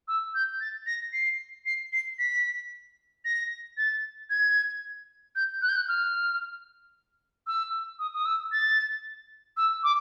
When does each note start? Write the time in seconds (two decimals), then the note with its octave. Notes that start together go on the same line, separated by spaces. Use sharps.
0.08 E6
0.35 G6
0.60 A6
0.86 A#6
1.13 C7
1.66 C7
1.93 C7
2.19 B6
3.25 A#6
3.77 A6
4.30 G#6
5.36 G6
5.62 F#6
5.69 G6
5.76 F#6
5.88 F6
7.47 E6
7.99 D#6
8.14 D#6
8.25 E6
8.52 A6
9.57 E6
9.83 D6